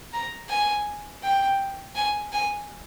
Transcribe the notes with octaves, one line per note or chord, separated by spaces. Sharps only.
A#5
G#5
G5
G#5
G#5